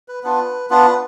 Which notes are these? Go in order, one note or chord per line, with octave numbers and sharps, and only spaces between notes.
B4
B3 D4 F4 B4
B3 D4 F4 B4